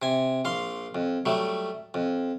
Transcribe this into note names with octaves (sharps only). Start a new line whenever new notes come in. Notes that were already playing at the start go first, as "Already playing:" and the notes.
C3 G#5
A#1 F5 C6
F2
F#3 G3 A3
F2